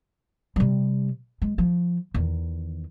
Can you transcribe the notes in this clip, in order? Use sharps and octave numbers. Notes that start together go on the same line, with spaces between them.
C3 G3
G#3
F3
E2 D#3